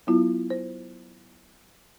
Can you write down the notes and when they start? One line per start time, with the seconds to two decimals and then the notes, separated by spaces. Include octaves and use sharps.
0.07 F#3 B3 E4 F4
0.50 C5